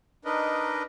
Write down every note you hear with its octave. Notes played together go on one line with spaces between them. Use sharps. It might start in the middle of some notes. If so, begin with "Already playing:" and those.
D4 D#4 A#4 B4 D#5